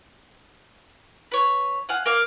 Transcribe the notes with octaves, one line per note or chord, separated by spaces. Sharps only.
B4 C#5
F5 F#5 G#5
A#3 F5 F6